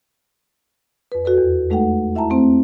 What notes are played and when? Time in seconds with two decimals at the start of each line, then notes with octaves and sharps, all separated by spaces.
1.12 F2 B4
1.24 F#4 A4 B4 D5
1.38 E2
1.70 G#3 A3 D#4 A4 F#5 G5
2.15 E4 E5 G5 A5 A#5
2.30 A3 C4 C5